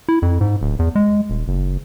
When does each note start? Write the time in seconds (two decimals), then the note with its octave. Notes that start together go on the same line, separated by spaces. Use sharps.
0.09 E4
0.22 F2
0.41 G#2
0.61 D1
0.79 E2
0.95 G#3
1.30 D#1
1.48 F#1